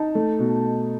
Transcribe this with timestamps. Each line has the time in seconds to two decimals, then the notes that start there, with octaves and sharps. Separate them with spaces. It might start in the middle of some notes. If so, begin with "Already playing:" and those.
Already playing: D#4 A5
0.15 A3
0.39 B2